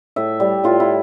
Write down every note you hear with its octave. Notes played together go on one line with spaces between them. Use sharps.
A2 E5
G3 E5
A2 F4
E4